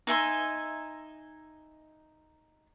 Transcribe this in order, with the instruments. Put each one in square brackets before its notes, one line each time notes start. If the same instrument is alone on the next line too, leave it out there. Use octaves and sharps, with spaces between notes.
[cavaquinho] D#4 E5 G#5 C6